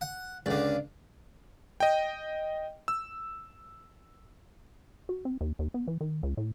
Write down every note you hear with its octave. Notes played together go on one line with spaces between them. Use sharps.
F#5
C#2 D3 D5 F5
D#5 G5
E6
F#4
C4
D#2
D#2
B3
E3
D#3
C#2
A2